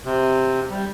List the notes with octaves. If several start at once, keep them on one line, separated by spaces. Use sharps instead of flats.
C3
G3